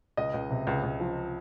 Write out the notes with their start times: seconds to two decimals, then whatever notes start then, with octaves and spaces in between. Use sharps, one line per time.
0.17 C#2 D#5
0.34 C#2
0.50 C3
0.67 C#2
0.83 C#2
1.00 F3